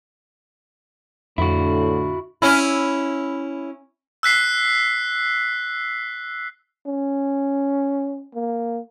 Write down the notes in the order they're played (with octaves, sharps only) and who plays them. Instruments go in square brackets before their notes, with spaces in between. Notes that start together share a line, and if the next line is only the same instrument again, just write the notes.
[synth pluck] F2 [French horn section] A2 D3 [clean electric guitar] E4 F#4
[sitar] C#4 E4
[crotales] E6 F#6 B6 C7
[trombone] C#4
A#3